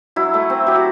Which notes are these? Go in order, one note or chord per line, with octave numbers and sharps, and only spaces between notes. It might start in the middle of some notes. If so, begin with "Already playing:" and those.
F#3 E4
A3
C4
F#3 G4
F#4